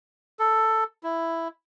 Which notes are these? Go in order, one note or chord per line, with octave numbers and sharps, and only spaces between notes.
A4
E4